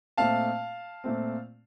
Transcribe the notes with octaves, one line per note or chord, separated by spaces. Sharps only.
A#2 A3 C4 F5 A5
A#2 A3 C4